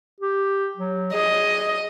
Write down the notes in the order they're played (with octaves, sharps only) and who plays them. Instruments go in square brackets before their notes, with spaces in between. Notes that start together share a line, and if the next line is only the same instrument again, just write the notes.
[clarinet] G4
F#3
[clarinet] G#4 [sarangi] D#5